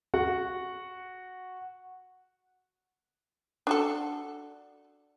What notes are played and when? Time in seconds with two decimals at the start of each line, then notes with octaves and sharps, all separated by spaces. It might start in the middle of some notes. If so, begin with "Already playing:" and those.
0.14 F#4 F#5
3.67 D4 F#4 A4